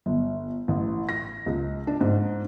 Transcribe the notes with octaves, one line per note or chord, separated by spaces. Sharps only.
G1
A1
A#6
C#2
D4
G#2